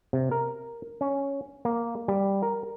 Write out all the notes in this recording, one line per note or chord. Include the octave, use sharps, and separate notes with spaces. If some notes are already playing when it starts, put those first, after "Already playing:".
C3
A#4
C#4
A#3
G3
A#4